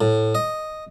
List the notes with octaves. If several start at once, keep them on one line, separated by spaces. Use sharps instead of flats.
A2
D#5